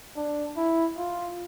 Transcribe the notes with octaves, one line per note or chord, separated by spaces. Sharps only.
D4
E4
F4